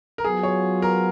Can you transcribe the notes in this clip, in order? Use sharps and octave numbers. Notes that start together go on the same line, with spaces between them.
A#4
F#3 B3 F4 G#4
C#5
A#4